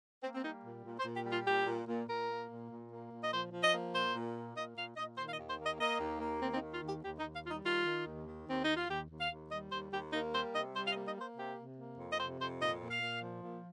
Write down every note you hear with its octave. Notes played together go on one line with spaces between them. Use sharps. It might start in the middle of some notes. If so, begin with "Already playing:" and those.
A#3 C4
C4
G3 D#4
A#2
A#2
C5
A#2
G4
G3
F4
A#2 G4
A#2
A#2
A#2 A#4
A#3
A#2
A#2
A#3
A#2
D#5
F3 C5
F3
D#5
A#3
A#2 C5
A#2
A#3
A#2 D#5
A#2 F5
A#2 D#5
D#3 C5
F5
D#5
D#2
C5
A#3
D#5
A#3 D#5
D#2
A#3
D#2 C4
C4
D#4
D#3
F4
D#2
G4
D#2 G4
D#4
D#2
F5
G3 F4
D#4
D#3 F4
D#3
D#2
D#3
D#2 C4
D#4
D#2
F4
D#2 G4
D#2
F5
D#2
G3 D#5
D#2 C5
D#2 G4
A#3 D#4
G3 C5
C3 D#5
G3 C5
F5
D#5
A#3
D#5
A#3 C5
C3 G4
C3
A#3
F2
D#5
C3 C5
F2 C5
A#2 D#5
A#2
F5
A#2
F3
A#2